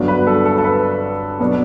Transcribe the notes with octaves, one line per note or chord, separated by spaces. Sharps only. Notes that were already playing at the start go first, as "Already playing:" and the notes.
Already playing: G2 D3 F#3 B3 D4
B4
A4
A4
A4
B4
B2 F#3 B3 D4